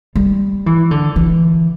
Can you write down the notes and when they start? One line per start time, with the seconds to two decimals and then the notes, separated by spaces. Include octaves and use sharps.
0.16 G3
0.66 E3
0.91 D3
1.16 E3